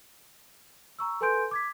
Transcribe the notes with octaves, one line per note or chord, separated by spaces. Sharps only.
A#5 C#6 E6
A4 B4 G#5 C6 G6 D7
D6 G#6 B6